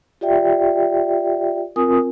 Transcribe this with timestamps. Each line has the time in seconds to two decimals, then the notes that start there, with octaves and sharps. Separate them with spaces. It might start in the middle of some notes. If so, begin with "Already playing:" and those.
0.21 F4 G4 D5 E5 G5
1.76 C4 F4 A#4 G#5 D#6